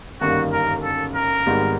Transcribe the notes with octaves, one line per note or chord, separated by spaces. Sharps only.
G1 F#2 D#3 G3 A#3 F#4
A#4
A4
A#4
G#1 G#2 D#3 G3 B3